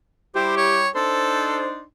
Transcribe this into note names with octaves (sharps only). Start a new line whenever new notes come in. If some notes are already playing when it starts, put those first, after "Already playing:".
G3 E4 G4 C5
C#5
D4 D#4 A4 C5